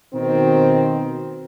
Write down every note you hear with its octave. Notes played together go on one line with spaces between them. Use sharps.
B2 D#3 C4